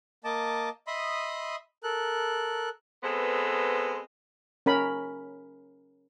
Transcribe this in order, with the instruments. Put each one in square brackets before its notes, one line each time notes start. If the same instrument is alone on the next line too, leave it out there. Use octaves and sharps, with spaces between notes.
[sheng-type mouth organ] A#3 D#5 A5 D6
D#5 E5 B5 C6 D#6
A4 A#4 F#6
[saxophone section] G#3 B3 C4 A4 B4
[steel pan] C#4 A#4 B5